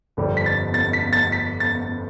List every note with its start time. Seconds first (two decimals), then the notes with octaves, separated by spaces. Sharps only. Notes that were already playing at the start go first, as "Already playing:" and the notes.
0.17 G1 F2 D3 G3 D4
0.37 B6
0.46 A6
0.74 A6
0.93 B6
1.13 A6
1.32 B6
1.60 A6